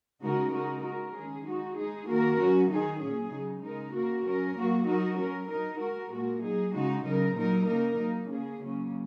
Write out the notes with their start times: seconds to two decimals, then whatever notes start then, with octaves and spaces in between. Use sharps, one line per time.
0.21 C#3 G#3 D#4 F#4 A#4
0.52 G#3 D#4 F#4 A#4
0.83 G#3 F#4 A#4
1.14 D#3 G#3 C#4 G#4
1.45 G#3 D#4 F#4
1.77 G#3 D#4 G#4
2.08 D#3 A#3 F#4 A#4
2.39 F#3 C#4 F#4
2.70 D#3 F#3 D#4 G#4
3.01 A#2 F#3 C#4 G#4
3.31 C#3 F#3 D#4
3.63 G#3 D#4 A#4
3.94 C#3 A#3 F#4 A#4
4.25 F#3 C#4 A#4
4.56 F#3 A#3 F#4
4.87 F#3 D#4 F#4 A#4
5.19 F#3 C#4 A#4
5.50 F#3 D#4 A#4
5.81 G#3 F#4 A#4
6.12 A#2 G#3 F#4 A#4
6.43 F#3 D#4 G#4
6.74 C#3 G#3 D#4 F#4
7.06 C#3 F#3 D#4 A#4
7.37 A#2 F#3 D#4 A#4
7.68 C#3 A#3 D#4 A#4
7.99 F#3 A#3 D#4
8.30 C#3 A#3 C#4 G#4
8.61 C#3 F#3 A#3 C#4